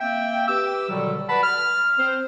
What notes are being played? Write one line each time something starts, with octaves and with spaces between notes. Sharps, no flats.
A#3 C4 E5 G5
G4 B4 D6 E6
B2 D3 D#3 F#3 G3
B4 D5 F#5 A5 B5
F6
C4 C5